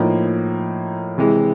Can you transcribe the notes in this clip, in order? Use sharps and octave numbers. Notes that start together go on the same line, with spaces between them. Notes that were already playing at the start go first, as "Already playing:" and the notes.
Already playing: A2 F3 A#3 D#4
C3 E3 G#3